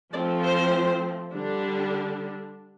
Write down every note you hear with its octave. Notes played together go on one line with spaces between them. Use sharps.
F3 A3 C4 D5
C5
D3 G3 D4